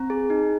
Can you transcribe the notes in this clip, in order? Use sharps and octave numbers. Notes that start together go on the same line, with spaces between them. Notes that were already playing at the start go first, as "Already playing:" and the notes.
Already playing: C4 A#5
G#4
D#4